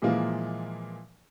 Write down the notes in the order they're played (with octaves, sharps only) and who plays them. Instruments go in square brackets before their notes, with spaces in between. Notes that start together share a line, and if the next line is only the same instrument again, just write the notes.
[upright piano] A#2 E3 F3 G#3 A#3